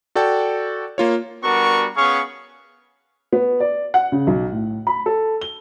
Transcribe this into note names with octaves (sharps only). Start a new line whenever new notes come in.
F#4 A4 D5 G5 A5
A#3 F4 C#5
G3 B3 D4 F#4 A#4 C#6
B3 C#4 G#4 F5 C#6
B3
D5
F#5
C#3
B1
A2
B5
A4
G7